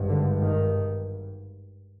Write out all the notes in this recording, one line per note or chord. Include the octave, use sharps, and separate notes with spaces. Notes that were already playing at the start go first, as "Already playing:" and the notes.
Already playing: G#1 G2
D3
D#3